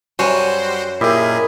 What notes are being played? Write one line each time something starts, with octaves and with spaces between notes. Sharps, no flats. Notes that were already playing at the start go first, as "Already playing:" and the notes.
F#2 G3 F#4 C5 C#5 G#5
A#2 E4 G4 G#4 A#4 D#5